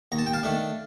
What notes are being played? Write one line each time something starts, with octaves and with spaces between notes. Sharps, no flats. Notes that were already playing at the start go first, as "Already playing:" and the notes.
D#2 A#5
A5
G5
F5 A5
D#3 A3 D4